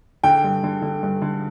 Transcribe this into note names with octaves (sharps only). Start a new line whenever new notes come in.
D3 G5
G2
D3
D3
G2
D3